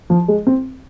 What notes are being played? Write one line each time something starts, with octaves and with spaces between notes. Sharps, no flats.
F3
G#3
C4